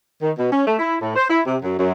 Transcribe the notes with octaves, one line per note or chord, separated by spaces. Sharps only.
D#3
B2
C#4
A3
E4
A2
C5
E4
C3
F#2
F#2